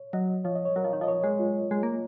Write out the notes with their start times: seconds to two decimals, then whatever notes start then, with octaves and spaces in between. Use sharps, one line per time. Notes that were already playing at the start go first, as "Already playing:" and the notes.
Already playing: C#5
0.13 F#3 D#5
0.44 F3 C#5
0.55 D#5
0.65 C#5
0.76 F#3 A#4
0.84 F3
0.93 D#3
1.01 F3 D#5
1.08 C#5
1.24 G#3
1.39 F4
1.71 G#3
1.83 A#3